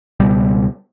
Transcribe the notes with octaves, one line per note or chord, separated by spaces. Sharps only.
C#2 B2 G3